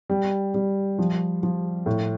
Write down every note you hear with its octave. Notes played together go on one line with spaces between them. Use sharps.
G3
G3
F3
F3
A2